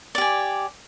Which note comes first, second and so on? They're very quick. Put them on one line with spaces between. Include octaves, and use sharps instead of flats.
D5 G4 G#5